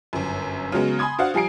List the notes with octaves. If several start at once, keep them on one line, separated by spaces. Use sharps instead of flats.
G1 F#2
C#3 F#3 G#3 B3
G#5 B5 C6 D#6 G#6
D4 F#4 C5 F5 F#5
F3 G3 G#5 A#5 C7 D7